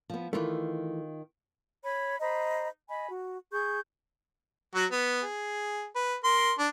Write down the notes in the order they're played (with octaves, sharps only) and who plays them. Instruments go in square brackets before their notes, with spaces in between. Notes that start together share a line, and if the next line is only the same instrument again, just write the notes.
[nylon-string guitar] F3 B3
[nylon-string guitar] D#3 F4 [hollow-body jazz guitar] E3 A3
[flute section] C#5 B5
C5 D#5 A#5 B5
D#5 G#5 B5
F#4
G#4 C#6 G6
[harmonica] F#3 F#4
B3
G#4
B4
A#4 C6
D4